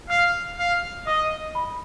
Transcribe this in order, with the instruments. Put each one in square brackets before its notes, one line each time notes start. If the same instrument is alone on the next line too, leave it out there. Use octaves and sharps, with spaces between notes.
[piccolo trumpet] F5 [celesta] F6
[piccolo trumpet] F5
[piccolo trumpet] D#5 [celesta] D#6
[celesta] B5